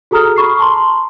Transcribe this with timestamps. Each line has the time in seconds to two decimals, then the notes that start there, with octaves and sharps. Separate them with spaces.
0.11 F#4 G#4 A4 A#5 D#6 F6
0.36 B5 C#6 C7
0.59 A5 A#5 C6